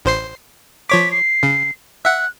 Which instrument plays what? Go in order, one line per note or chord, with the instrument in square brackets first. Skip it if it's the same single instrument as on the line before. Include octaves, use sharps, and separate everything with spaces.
[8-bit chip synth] A1 C5 C7
[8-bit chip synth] F3 C#5 D6 [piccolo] B6
[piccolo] C7
[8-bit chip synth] C#3
[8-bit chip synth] E5 F#5 [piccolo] F#6